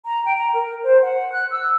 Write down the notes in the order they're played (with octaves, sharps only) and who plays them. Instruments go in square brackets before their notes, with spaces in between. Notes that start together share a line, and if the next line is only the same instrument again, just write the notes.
[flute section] A#5
G5
A#5
A#4
C5
F#5
F#6
E6